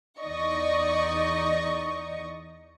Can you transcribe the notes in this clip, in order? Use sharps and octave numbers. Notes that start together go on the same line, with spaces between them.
E2 D#4 D5 D#5 C#6